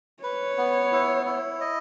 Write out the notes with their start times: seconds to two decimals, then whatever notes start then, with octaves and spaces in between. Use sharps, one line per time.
0.23 B4 C#5
0.58 B3
0.92 E4
1.26 E4
1.61 D#5